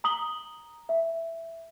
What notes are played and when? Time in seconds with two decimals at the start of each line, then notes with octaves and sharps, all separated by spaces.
0.04 A#5 D#6 F#7 G7
0.89 E5